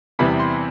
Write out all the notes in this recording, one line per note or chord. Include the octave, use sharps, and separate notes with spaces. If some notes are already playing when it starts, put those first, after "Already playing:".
E2 C3 E3 G3 B3 B5
C6